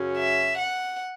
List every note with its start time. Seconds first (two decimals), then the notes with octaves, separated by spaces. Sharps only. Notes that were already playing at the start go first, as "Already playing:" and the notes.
Already playing: F#2 C#3 F#3 C#4
0.17 E5
0.57 F#5